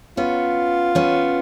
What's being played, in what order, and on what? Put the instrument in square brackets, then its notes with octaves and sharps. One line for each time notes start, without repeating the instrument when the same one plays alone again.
[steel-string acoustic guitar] B3 C#4 [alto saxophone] F4
[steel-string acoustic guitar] B3 C#4